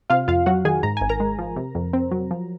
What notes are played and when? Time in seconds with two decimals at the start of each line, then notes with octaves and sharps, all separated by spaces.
0.10 C3 F4 F5
0.28 F2 F4 F5
0.46 F#3 F#4 F#5
0.65 D#3 G#4 G#5
0.83 G#2 A#5
0.97 G#1 G#5
1.09 A#4 A#5
1.20 G#3
1.39 F3
1.56 C3
1.75 F2
1.93 C4
2.11 F#3
2.31 F3